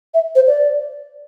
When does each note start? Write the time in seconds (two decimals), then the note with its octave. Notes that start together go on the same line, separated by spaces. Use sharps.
0.14 E5
0.35 C5
0.47 D5